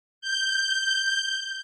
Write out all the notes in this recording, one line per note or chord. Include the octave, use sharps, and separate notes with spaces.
G6